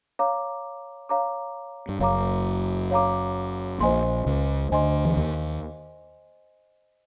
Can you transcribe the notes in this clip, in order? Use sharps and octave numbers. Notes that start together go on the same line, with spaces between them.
C#5 F5 A#5 D6
C#5 F5 A#5 D6
G2
F#1 F#2 C#5 F5 A#5 D6
C#5 F5 A#5 D6
A#1 A#2 C5 D#5 G#5 C6
C#2 C#3
D2 D3 C5 D#5 G#5 C6
E3
D#2 D#3